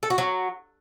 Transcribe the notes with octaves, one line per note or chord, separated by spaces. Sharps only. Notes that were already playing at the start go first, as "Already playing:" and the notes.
A4
F#4
F#3